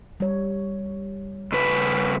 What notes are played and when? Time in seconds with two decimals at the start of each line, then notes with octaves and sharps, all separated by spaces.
0.20 G3 C#5
1.52 G2 C#3 B4